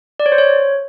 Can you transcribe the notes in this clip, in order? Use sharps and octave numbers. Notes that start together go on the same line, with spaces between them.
D5
C#5
C5
C#5